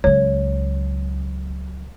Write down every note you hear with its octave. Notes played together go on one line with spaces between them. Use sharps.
C#2 F#3 C#5